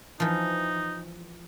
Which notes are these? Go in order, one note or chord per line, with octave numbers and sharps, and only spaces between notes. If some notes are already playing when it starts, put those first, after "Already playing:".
E3 F3 D#4